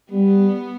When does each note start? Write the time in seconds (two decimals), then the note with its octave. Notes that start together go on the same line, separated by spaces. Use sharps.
0.12 G3 B3